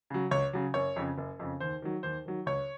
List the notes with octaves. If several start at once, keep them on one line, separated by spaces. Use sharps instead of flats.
C#3 F#3
C#2 C#5
C#3 F#3
F#1 C#5
F2 C#3
F#1
F2 C#3
D#2 C5
D#3 F#3
D#2 C5
D#3 F#3
C#2 C#5